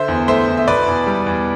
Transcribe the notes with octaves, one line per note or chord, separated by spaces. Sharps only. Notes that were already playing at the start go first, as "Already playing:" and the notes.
Already playing: D3 C5 E5
E2
A3 C5 E5
E2
E5
B2 B4 D5
E2
G3
E2